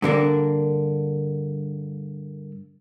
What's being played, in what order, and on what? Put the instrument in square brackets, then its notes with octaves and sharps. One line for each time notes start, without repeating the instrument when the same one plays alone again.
[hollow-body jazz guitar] G2 D3 A#3 D4